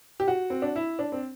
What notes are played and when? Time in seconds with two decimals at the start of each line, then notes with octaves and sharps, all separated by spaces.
0.20 G4
0.28 F#4
0.50 C4
0.62 D4
0.76 E4
0.99 D4
1.12 C4